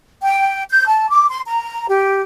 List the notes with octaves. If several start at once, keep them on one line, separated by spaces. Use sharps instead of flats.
G5
G6
A5
D6
C6
A#5
G4